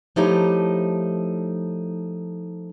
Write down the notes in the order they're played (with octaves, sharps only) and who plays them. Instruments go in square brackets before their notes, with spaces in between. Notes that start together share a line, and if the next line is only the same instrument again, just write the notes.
[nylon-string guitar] F3 A3 D#4 E4 G4 C#5